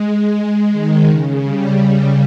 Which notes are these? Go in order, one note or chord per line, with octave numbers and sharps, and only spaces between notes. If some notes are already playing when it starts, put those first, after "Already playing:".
Already playing: G#3
G#3
D#3
C#3
G3